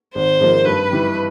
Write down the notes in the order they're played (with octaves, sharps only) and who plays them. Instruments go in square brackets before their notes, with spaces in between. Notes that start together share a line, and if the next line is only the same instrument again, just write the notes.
[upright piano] G#1 [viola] C5
[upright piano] G#2 F3 A#3
[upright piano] G2 [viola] B4
[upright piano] E3 G3